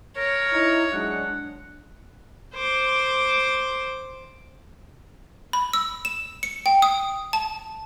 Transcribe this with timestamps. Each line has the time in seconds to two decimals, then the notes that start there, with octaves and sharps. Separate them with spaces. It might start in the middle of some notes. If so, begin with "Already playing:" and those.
0.17 A#4 C#5
0.53 D#4 E4
0.92 F#3 G#3 D4 F#5
2.54 C5 D6
5.53 B5
5.73 E6
6.05 E7
6.43 C#7
6.66 G5
6.82 D#6
7.33 A5